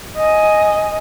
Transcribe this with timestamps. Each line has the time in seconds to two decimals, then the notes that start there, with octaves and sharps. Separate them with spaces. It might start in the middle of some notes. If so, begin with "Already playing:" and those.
0.18 D#5 G#5